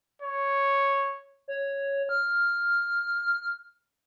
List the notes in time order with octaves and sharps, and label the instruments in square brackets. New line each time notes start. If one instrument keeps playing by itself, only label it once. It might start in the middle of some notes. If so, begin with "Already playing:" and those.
[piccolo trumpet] C#5
[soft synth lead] C#5
F6